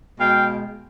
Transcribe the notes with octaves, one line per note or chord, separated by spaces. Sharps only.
B2 G#3 F5 G5